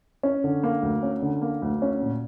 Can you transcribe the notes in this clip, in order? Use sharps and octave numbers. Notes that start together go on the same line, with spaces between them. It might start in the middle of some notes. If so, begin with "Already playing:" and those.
C#4
D3
A#3
D2
C#4
D3
A#3
D2
C#4
A#2